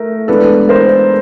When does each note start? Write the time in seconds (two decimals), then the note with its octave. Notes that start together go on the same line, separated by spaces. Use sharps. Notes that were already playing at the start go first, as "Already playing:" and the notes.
Already playing: A3 A#4
0.28 E3 G#3 B3 D4 A4 B4
0.69 A#4 C5